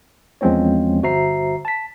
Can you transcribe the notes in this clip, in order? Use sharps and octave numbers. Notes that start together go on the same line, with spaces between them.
E2 F3 G#3 C4 C#4 C#5
G1 F#4 C5 E5 A#5 C7
A5 B6